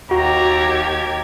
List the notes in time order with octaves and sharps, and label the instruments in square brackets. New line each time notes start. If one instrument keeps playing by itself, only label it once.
[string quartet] D#2 G4 G#6 [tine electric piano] F#4 [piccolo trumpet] A#5